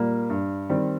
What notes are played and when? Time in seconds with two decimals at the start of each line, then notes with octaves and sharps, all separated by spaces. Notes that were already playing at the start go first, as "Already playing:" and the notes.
Already playing: A#2 G3 A#3
0.30 G2
0.69 D#3 G3 C4